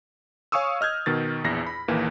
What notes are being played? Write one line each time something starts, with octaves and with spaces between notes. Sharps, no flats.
C#5 F5 G#5 C#6 D#6 E6
D#5 F6 G6 G#6
B2 D#3 A6
A#1 E2 E4 A#6
B5
A#1 D#2 E3 A#3